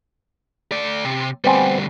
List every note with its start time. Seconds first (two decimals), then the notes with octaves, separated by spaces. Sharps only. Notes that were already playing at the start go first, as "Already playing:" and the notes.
0.72 A3 D5
1.04 C3
1.44 D2 G3 B3 C4 G#5